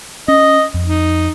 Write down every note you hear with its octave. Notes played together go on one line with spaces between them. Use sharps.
C#4 D#5
F2
D#4